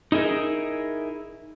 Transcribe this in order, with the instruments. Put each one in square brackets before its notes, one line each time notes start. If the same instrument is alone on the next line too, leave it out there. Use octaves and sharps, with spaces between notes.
[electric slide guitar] D#4 E4 G#4 A#4